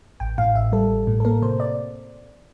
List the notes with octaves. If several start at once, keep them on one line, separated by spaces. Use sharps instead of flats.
A1 G5
A2 F5
A1 E5
G3 A4
A1
A2
A4
A#3 A#4
C3 C5
D5